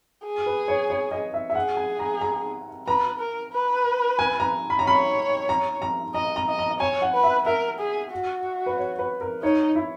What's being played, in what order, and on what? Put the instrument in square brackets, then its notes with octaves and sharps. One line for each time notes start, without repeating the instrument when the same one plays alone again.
[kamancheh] G#4
[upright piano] B4
C#5
C#5
D#5
E5
E5
[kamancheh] G#4 [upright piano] F#5
[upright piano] G#5
A#5
A#5
[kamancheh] B4 [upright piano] A#5
[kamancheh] A#4
B4
[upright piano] G#5
A#5
B5
A#5
[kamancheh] C#5 [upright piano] B5
[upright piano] A#5
A#5
[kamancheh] D#5 [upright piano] A#5
[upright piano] A#5
[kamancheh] D#5
[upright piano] A#5
[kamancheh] C#5 [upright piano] G#5
[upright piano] F#5
[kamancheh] B4
[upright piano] E5
[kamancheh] A#4 [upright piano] E5
[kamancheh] G#4
F#4
[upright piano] B4
C#5
B4
A#4
[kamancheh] D#4 [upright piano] C#5
[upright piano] E4